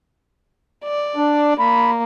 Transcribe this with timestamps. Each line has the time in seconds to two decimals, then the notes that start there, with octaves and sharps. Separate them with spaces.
0.84 D5
1.16 D4
1.59 A#3 B5